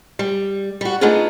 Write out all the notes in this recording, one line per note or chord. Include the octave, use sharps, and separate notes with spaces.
G3
G3 F#4
A3 B3 D4 D#4 F4 G#4